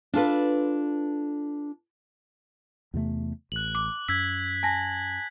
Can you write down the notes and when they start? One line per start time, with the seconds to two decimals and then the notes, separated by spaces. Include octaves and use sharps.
0.13 D4 F4 A4 B4
2.94 E2 C3 A3
3.52 A1 F#6 F#7
3.75 D6
4.08 F#2 E6 G#6 B6
4.63 G#5 A5 A#6